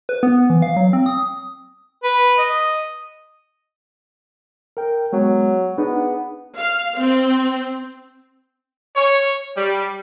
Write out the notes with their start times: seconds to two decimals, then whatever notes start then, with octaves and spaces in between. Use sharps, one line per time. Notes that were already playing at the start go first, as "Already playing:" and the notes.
0.09 B4
0.23 B3
0.50 E3
0.62 F5
0.77 F#3
0.93 C4
1.06 D#6
2.04 B4
2.39 D#5
4.77 A#4 G5
5.13 F#3 G#3 B3
5.78 B3 D4 D#4 G#4
6.57 F5
7.00 C4
8.96 C#5
9.57 G3